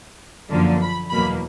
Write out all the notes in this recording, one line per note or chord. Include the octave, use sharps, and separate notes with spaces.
F#2 D3 F3 A#3
B5
E2 B2 F#3 A#3 B5